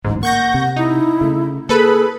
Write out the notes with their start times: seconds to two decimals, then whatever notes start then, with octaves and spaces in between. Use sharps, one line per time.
0.04 D1 A1 G#2
0.23 A#3 F#5 C#6 G6 A#6
0.54 C3
0.76 D#4 E4
1.21 C#3 A3
1.69 A#3 G#4 A4 B4 B5